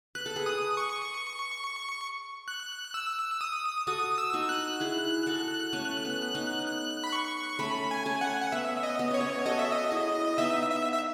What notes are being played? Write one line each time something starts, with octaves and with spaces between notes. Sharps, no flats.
B4 F#6
A4
G#4 B4
D#6
C#6
F#6
E6
D#6
F#4 A4 D#6
E6
D#4 F#4
F#6
E4 G#4
F#4 A4
A3 C#4
B3
B3 D#4
F#6
B5
C#6
A3 C#4 B5
G#5
A3 C#4
F#5
G#5
F#5
B3 E5
D#5
B3
C#4 C#5
B3
F#4 A4 D#5
E5
D#5
E4 G#4
B3 D#4 E5
E5
E5